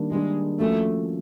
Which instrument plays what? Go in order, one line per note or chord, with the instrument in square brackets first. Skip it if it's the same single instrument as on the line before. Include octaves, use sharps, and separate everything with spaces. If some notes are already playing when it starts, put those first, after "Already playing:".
Already playing: [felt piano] D#3 G3 A#3 D4
[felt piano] D#3 G3 A#3 D4 [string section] G#3
[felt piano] F3 A#3 C#4 F#4 [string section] A3